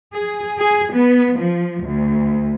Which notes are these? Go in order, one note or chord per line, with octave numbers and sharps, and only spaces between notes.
G#4
G#4
B3
F3
D2